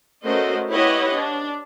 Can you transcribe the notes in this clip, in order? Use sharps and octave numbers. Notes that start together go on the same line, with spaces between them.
A3 C#4 F#4 A#4 C5 D#5
E4 G4 B4 C#5 D#5 F#5
D4